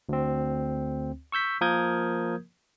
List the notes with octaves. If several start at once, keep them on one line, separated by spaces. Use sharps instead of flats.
D2 C4
C#6 E6 G6 B6
F3 A#3 A#4 D#6 G6 G#6